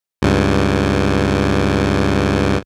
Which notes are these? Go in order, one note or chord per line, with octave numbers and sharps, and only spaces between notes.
C#2 G2